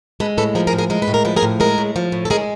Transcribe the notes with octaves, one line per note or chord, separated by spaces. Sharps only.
G#3 A4 B4
A2 A4 B4
F3 G#4 A#4
G#4 A#4
A2
G#4 A#4
G#3 A#4
B4
A2
A#4
F3 B4
G#4 A#4
A2
G#3 G#4 A#4
A2
F3
A2
A4
G#3 G#4 A#4